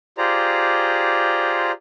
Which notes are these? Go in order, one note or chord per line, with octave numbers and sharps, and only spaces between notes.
F4 G4 G#4 C5 D5 A#5